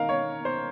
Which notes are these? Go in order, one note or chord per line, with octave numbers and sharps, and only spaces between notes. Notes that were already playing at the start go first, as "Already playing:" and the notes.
Already playing: D#3 A#3 D#4 A#4 F5
C#5
C5